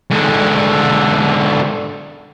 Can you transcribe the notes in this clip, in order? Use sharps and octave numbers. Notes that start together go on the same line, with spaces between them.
G#2 D3